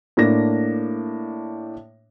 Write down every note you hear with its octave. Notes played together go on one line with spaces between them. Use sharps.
A2 A#3 D4 A#6